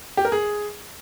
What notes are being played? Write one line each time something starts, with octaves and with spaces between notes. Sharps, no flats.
G4
A#4
G#4